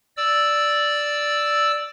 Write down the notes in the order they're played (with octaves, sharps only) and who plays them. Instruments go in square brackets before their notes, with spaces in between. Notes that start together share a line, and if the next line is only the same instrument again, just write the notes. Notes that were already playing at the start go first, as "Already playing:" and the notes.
[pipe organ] D5 E6